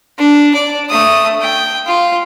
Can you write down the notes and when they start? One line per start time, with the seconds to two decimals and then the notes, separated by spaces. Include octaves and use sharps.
0.19 D4
0.55 D5
0.90 A3 D#6
1.42 G5
1.86 F4